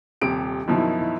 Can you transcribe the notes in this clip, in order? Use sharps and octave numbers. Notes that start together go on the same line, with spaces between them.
D#1 C3 D7
F#2 B2 D#3 F3 E4